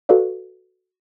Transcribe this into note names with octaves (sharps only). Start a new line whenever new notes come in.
F#4 A4 B4 D5 F5